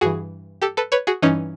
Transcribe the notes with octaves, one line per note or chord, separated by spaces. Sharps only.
G2 E3 F#4 G#4
G4 A4
A4 B4
B4 C#5
F#4 G#4
G2 E3 C#4 D#4